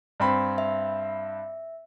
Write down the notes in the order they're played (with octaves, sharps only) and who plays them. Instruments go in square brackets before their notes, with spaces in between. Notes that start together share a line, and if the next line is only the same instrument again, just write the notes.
[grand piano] G2 C4 B5
[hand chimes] E5